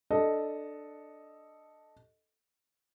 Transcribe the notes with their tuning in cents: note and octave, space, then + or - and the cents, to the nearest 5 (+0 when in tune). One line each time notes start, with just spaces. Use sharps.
D4 +10 A4 +0 D#5 +0